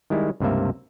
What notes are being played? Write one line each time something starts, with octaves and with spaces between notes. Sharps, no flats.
D#3 G3 G#3 E4
C#2 G2 C3 A#3 E5